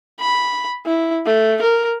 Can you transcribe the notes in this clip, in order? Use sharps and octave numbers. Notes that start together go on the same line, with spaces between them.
B5
E4
A3
A#4